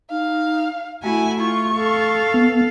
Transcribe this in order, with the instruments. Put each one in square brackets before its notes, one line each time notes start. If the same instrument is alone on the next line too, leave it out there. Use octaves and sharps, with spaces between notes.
[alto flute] D#4 [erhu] F5
[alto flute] A3 [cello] E4 F#4 [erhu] G#5
[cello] F4 [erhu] C#6
[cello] A4 F5
[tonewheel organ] B3